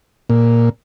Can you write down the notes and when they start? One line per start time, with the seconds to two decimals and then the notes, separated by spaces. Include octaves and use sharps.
0.30 A#2